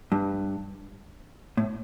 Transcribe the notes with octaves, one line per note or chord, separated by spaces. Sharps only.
G2
A2